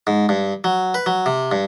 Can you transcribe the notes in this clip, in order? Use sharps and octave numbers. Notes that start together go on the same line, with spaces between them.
G#2
G2
F#3
B4
F#3
C3
G2